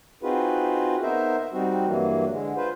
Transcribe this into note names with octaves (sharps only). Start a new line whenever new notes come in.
C4 D#4 F4 F#4 G#4 B4
B3 D#4 A#4 C5 E5
G3 C4 D#4 F#4
G2 E3 F#3 A#3
D3 G#3
F4 B4 C5